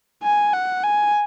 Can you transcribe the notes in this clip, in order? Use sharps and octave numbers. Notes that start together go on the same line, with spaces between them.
G#5
F#5
G#5